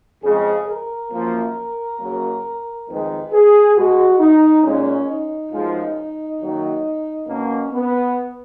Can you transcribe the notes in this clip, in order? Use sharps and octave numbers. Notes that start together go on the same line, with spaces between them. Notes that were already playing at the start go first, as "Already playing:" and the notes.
F2 C#3 G#3 G#4
A#4
F#2 F3 A#3
F#2 C#3 F#3 A#3
F2 D#3 G#3 B4
G#4
B2 G#3 F#4
D#4
A#2 G#3 C#4
D#4
F#2 F3 G#3
F#2 D#3 F#3 A#3
B2 A#3 C#4
B3